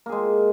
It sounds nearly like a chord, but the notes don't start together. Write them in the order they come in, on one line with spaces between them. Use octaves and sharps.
A#3 G#4 G#3